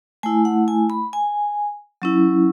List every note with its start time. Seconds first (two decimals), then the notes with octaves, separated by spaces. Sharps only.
0.23 A3 E4 G#5
0.45 F#5
0.68 G#5
0.90 B5
1.13 G#5
2.02 F#3 C#4 E4